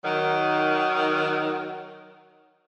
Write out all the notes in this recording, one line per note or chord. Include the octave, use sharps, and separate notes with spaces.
D#3 F#3